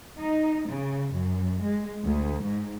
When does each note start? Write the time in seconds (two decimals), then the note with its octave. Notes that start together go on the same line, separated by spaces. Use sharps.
0.19 D#4
0.69 C#3
1.14 F#2
1.61 G#3
2.04 D2
2.45 G#2